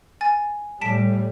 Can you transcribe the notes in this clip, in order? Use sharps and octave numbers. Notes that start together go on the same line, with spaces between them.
G#5 A6
A2 G3 A5 B6 D7